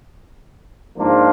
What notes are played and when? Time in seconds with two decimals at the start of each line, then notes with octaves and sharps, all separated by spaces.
0.96 G#2 F3 A#3 D4 F4